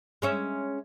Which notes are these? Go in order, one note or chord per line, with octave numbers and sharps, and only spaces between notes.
G#3 C#4 E5